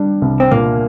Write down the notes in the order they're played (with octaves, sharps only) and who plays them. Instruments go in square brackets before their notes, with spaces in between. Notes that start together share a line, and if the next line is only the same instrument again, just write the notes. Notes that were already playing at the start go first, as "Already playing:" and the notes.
Already playing: [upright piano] G3 D4
C2
[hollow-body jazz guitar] C4
[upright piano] A#2 [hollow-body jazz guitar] A#3